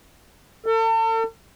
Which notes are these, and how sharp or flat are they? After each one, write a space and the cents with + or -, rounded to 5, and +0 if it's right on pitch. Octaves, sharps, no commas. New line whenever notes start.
A4 +40